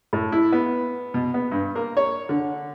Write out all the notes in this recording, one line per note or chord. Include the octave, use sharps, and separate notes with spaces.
A2
E4
B3
B2
B3
G2
A#3
C#5
D3